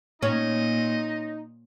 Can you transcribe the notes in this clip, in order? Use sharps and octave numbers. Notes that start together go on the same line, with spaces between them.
A#2 C#4 D#4 D#5